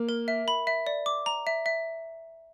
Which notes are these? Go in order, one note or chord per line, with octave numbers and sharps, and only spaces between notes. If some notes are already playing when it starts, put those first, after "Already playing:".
Already playing: A#3
A#4
E5
B5
E5
D5
D6
A#5
E5
E5